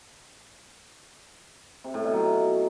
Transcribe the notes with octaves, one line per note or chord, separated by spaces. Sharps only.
C3
A2
B2
F#3